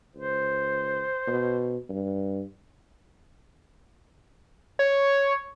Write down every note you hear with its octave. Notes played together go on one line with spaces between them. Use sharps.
C#2 C5
B2
G2
C#5